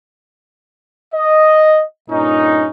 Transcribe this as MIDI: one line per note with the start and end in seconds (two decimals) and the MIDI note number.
1.14 1.83 75
2.10 2.69 43
2.10 2.69 46
2.10 2.69 61
2.10 2.69 63